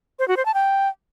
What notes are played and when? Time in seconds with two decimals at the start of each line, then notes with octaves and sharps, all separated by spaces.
0.19 C5
0.28 F#4
0.37 C5
0.46 A5
0.54 G5